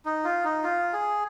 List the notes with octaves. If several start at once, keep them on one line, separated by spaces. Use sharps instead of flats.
D#4
F4
D#4
F4
G#4